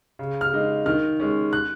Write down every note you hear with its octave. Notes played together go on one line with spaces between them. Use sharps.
C#3
F6
G#3 D#4
D#3 F6
G#3 C#4
F#6